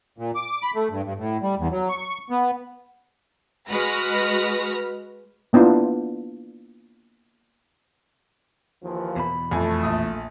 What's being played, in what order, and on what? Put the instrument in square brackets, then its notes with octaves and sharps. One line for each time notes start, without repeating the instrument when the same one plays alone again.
[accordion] A#2
D6
B5
A3
G2
G2
A2
G3
E2
F#3
C#6
B3
[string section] G#3 F#4 B4 F6 A#6
[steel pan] A#3 B3 D4 E4 F4
[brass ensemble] D#2 E3 F3
[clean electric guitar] E2 B2 B5
[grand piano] F2 G#5 [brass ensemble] A3
[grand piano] A#1 D#6